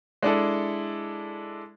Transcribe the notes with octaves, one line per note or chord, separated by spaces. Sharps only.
G#3 D4 E4 A4